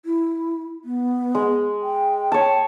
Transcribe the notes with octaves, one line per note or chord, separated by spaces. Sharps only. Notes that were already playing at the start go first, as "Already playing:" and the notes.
E4
B3
G#3
G5
C#5 A5